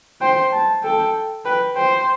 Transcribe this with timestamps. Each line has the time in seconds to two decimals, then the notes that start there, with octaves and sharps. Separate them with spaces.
0.21 C5 G5
0.52 A5
0.83 A4 G5
1.45 B4 G5
1.75 C5 G5